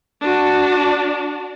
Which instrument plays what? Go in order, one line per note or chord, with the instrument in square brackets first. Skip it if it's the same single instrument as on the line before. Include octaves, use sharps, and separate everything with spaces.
[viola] D4 F#4